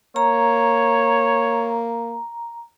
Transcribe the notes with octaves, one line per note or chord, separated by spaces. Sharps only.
A#3 C#5 A#5